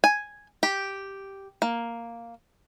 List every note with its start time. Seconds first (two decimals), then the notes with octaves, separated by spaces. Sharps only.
0.04 G#5
0.63 G4
1.62 A#3